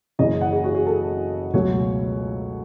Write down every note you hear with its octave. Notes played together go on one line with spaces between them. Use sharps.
F#1 F#2 C#3 E3 D#5
F#5
G#4
F#4
G#4
A4
C#2 B2 F#3 A3 C#5